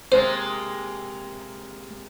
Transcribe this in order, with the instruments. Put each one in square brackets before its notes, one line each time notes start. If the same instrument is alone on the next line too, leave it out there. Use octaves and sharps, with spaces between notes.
[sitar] C3 G#3 A#3 [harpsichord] C5